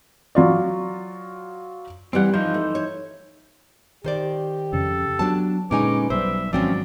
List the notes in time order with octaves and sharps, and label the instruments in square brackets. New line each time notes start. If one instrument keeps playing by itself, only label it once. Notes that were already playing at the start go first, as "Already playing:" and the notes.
[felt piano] F#3 F4 D5
[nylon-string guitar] E3 G3 [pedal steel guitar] C4 F#5
[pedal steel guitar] E3 D#4 C5 [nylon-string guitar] F3
[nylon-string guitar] A3
C#5
[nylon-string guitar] D#3 C5 D5 [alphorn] G4
[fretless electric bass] F2 C#3 [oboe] A4
[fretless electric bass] F#3 B3 [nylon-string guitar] D4 A5
[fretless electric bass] A#2 D3 G#3 [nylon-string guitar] C#4 D#4 G#5 [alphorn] B4 [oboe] D6
[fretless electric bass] B1 F#3 G3 [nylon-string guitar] C5 [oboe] E5
[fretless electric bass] G#1 F#3 [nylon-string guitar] F3 C4 C#4 [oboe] D5